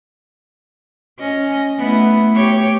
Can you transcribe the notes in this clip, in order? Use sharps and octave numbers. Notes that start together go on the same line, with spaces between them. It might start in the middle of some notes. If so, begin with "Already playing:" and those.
C#4 D#5
A3 B3 E4
G4 C#5